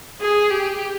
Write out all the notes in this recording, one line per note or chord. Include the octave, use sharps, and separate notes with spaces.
G#4
G4